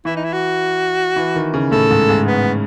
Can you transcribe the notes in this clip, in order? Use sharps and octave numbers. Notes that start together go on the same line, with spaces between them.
E3 E4
D#4
E4
F#4
E3
D#3
C#3
A2 A4
G#2
G#2
B3